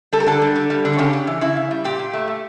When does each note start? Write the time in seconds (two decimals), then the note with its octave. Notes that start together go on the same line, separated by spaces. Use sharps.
0.13 G3 A4
0.20 A#4
0.26 D3 A4
0.42 G3
0.56 D3
0.70 G3
0.85 D3
0.93 A4
0.98 C#3 G4
1.13 C#3
1.27 E3
1.41 C#3 E4
1.56 C#3
1.71 G3
1.84 A#2 G4
1.99 A#2
2.13 A3
2.28 A3